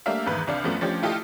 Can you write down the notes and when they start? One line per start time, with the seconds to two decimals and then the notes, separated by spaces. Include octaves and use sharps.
0.06 G3 A3 A#3 D4 E5 F5
0.26 E2 G#2 D#3 B4
0.47 C2 D4 F5
0.64 F#2 F3 A3 B3
0.81 F3 A3 C#4 D4 G4
1.02 A3 E4 F4 G4 A4 D#5